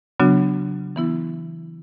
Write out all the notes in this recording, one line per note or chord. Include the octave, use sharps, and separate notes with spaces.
C#3 F#3 B3 D4 F#4
E3 B3 E4